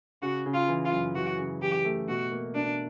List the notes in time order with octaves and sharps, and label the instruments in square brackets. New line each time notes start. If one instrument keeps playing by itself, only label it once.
[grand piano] C#3 [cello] F#4
[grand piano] C#3
[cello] F4
[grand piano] E3
[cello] F4
[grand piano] F#2
[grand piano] E3 [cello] F#4
[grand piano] C#3
[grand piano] E3 [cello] G4
[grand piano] A3
[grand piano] B2 [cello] F#4
[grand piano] A#3
[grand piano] B2 [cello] D4